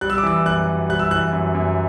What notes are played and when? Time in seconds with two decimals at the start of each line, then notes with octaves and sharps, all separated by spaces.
0.01 G3 F#6
0.10 E6
0.18 D6
0.23 E3 E6
0.45 F#2 F#6
0.68 F#2
0.90 G3 F#6
0.99 E6
1.11 E3 F#6
1.33 F#2
1.55 F#2